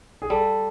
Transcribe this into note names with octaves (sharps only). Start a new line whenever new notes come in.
G#4
G3 A4